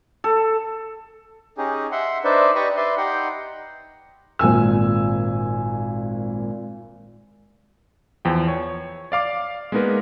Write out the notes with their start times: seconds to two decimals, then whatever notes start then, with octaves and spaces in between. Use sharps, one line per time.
0.24 A4
1.58 C#4 D#4 G4 G#4
1.92 E5 F#5 C6
2.24 D4 D#4 B4 C5 D5 E5
2.55 G4 B4 D5 D#5 B5 C#6
2.77 B4 D5 E5 C6
2.97 D#4 G4 F#5 G5 C6
4.39 G#1 A#2 G#5 E6
8.25 E2 F3 G5
8.48 C#5
9.12 D5 F5 D6
9.72 G#3 A#3 B3 D#4 A#4 B4